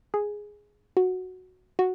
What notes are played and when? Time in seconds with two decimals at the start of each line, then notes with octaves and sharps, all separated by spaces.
0.14 G#4
0.97 F#4
1.79 F#4